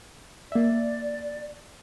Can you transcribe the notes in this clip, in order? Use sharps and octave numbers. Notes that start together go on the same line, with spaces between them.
A#3 D5 E5